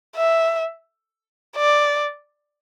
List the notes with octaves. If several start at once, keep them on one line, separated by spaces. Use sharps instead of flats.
E5
D5